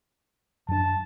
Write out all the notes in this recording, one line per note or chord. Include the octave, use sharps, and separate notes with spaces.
F#2 D4 A5